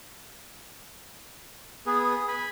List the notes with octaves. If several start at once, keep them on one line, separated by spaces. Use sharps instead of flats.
B3 G#4 B4 D#6
G#5 B5